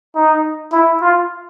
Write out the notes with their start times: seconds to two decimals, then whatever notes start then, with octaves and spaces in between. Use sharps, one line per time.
0.15 D#4
0.72 E4
1.01 F4